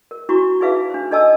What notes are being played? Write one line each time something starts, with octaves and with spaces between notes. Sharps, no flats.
A#4
D4 E4 F#4 A#5 C#6
D#4 E4 G#4 B4 E5 F5
D4 C5
D4 A4 D#5 G#5 A5 E6